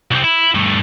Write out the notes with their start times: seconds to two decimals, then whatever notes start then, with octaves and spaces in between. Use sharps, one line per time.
0.11 C2 C4
0.24 E4
0.55 G2 A3